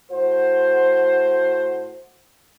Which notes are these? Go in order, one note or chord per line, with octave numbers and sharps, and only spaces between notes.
A2 F#4 C5